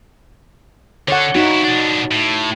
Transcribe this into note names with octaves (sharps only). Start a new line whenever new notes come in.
D3 A4 C#5 F#5
G2 D#4 E4 F#4
B2 D4
A2